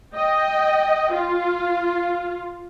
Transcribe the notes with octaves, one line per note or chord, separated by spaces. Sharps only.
D#5 G5
F4